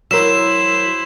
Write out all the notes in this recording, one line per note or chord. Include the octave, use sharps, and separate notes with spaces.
F#3 E4 A#4 C5 E6 E7